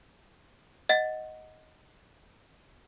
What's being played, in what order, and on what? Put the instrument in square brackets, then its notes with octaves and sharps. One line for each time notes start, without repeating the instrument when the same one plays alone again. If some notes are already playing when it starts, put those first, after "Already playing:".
[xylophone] D#5 F#5 A6